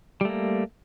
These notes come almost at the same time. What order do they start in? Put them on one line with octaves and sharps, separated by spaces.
G3 A3 A#3